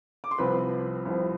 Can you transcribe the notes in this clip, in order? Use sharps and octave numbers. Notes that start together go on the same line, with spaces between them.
D6
C6
C2 C3 F3 B4 B5
C2 C3 F3